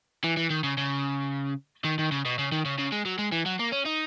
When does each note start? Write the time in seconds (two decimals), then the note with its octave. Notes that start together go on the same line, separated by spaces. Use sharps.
0.24 E3
0.37 E3
0.50 D#3
0.64 C#3
0.78 C#3
1.85 D#3
1.99 D#3
2.12 C#3
2.25 B2
2.39 C#3
2.52 D#3
2.65 C#3
2.79 C#3
2.92 G#3
3.06 F#3
3.19 G#3
3.32 E3
3.46 F#3
3.60 A#3
3.73 C#4
3.86 D#4